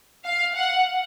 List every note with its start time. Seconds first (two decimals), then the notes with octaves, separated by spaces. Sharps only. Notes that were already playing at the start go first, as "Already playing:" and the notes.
0.24 F5
0.55 F#5